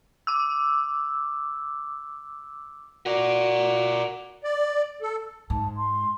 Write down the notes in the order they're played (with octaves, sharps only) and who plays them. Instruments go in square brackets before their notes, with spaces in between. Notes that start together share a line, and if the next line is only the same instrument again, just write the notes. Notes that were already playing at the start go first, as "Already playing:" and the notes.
[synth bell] D6 E6
[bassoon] F#4 [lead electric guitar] A#4 D5
[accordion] D5
A4
[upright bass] G#2 [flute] A5
[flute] C6